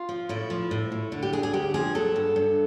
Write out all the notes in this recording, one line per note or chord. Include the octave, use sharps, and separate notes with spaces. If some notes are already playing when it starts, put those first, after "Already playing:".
Already playing: F4
F3
A2 E4
F3
A2
A2
D3
G4
D2 G#4
G#4
D2 G4
F3 G#4
F#3 A4
G2
G2